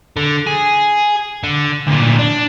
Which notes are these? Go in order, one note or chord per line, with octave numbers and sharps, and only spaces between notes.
D3
G#4
D3
D2 A#2
D4